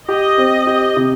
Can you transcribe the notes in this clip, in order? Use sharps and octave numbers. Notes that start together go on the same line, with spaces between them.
G4 D#5
C4
G4
C3